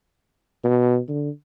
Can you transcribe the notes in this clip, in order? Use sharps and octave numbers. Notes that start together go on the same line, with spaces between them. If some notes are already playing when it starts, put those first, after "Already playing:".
B2
D3